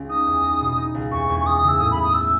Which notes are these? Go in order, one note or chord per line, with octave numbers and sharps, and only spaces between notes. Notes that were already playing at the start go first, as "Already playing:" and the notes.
Already playing: C#2 C#4
D#4 D#6
E2
D#4
B2
D#4
C#2
E2 C#6
E2
C#6
C#4 D#6
D#6
C#3
E6
A2 D#6
B5
A2
D#6
A3 E6